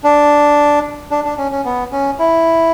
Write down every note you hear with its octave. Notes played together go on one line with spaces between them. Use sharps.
D4
D4
D4
C#4
C#4
B3
C#4
E4